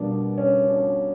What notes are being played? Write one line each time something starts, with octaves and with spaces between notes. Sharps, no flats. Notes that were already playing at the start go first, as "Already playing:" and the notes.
Already playing: B2 G3 A#3 D4
C#4
D4